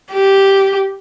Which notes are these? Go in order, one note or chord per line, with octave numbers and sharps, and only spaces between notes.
G4